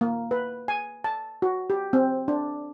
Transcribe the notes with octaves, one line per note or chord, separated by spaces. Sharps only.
A#3
B4
G#5
A5
F#4
G4
C4
D4